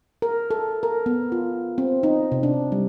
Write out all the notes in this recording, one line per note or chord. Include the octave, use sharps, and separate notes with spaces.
A#4
A4
A#4
B3
F4
C4
D#4
C3
D4
G3